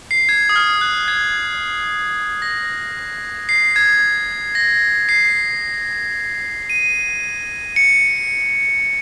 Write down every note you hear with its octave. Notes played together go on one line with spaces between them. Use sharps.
C7
G#6
D#6
F6
F#6
G#6
A#6
C7
G#6
A#6
C7
D#7
C#7